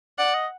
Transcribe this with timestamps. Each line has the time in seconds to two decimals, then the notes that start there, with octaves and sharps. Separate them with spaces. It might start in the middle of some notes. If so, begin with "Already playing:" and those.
0.18 D5 F#5
0.35 D#5